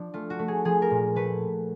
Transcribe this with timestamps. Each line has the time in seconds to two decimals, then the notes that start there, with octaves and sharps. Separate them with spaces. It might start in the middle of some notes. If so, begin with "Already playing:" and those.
Already playing: F3 D4
0.14 A3 F4
0.30 F#4
0.39 A3
0.48 G#4
0.65 F3 G#4
0.82 A#4
0.91 A#2
1.16 A3 B4